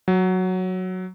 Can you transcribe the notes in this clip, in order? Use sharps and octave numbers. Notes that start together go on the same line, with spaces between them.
F#3